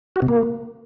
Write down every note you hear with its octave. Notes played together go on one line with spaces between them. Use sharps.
F#4
C3
A#3